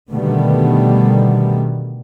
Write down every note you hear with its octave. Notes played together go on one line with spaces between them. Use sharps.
B2 D3 D#3 G3 A3 B3